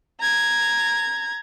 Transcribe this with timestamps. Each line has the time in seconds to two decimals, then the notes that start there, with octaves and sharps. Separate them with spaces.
0.21 A#5 G#6